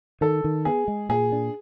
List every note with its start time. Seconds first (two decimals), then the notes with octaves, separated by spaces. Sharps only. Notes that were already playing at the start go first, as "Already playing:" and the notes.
0.21 D#3 A4
0.44 D#3
0.65 B3 G#4
0.88 G#3
1.09 A#2 G#4
1.32 D4